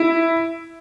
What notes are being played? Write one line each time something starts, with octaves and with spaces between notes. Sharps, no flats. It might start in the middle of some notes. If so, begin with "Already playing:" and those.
Already playing: E4